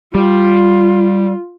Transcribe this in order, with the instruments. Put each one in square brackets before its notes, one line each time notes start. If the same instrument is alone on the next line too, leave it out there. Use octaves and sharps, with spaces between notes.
[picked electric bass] G3 [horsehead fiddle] F4